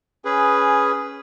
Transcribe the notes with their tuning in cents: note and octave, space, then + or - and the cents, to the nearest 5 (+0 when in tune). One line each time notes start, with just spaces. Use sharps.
C#4 +0 G#4 +0 B4 +0